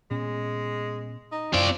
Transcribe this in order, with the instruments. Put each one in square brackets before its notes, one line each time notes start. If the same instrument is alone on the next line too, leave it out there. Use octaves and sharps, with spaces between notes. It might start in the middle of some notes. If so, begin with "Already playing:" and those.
[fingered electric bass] A#2 B3 C#4 [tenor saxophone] G#3
[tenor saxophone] D#4
[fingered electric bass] F#2 [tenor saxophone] F3 [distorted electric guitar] C4 D5